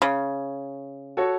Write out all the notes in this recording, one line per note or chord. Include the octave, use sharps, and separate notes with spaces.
C#3
F#4 A4 C#5